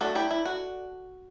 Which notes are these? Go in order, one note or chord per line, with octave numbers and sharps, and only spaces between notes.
A3 D4 F#4 A4
E4 G4
E4
F#4